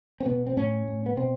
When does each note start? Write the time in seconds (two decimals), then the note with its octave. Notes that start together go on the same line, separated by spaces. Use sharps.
0.20 C4
0.25 B2 B3
0.47 C4
0.57 A2 C#4
0.88 A2
1.06 B3
1.17 B2 C4